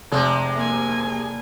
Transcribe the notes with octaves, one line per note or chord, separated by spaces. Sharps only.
F1 C3 G#3
A#3 G#5